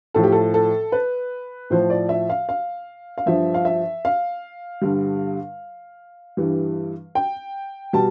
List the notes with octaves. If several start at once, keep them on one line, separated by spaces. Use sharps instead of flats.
A2 F3 A4
G4
A4
A4
B4
A2 F3 C5
D5
E5
F5
F5
F5
G2 F3 E5
F5
E5
F5
G2 D3 G3
G2 E3 G3
G5
B2 G3 A5